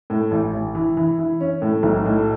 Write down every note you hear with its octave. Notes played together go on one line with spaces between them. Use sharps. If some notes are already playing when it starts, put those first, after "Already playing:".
A2
A1
A1
E3
E3
E3
C#4
A2
B1
A2